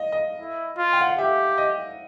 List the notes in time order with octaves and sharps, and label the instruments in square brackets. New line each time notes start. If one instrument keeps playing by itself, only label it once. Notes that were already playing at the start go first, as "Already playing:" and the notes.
Already playing: [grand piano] D#5 F5
D#5
[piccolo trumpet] E4
F4
[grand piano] G5
F#5
F5
[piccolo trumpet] G4 [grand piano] E5
[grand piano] D#5